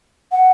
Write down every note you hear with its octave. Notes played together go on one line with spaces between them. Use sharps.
F#5